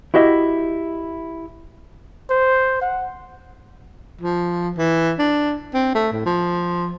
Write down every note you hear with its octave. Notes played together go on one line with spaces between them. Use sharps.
E4 F#4 G4 D#5 E5
C5
F#5
F3
E3
D4
C4
A3
A2
F3